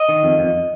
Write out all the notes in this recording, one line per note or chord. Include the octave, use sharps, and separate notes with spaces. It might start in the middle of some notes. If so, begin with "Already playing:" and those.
Already playing: D#5
D#3
F2
F2